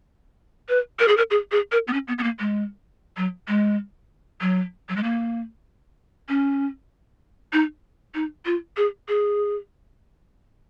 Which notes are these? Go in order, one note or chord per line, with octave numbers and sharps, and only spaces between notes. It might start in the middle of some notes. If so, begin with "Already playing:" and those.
B4
A#4
G#4
A#4
G#4
G#4
A#4
B3
C#4
B3
B3
A#3
G#3
F#3
G#3
F#3
F#3
G#3
A#3
C#4
D#4
D#4
F4
G#4
G#4